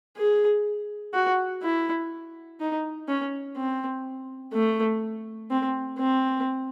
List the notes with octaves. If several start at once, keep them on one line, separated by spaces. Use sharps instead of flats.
G#4
F#4
E4
D#4
C#4
C4
A3
C4
C4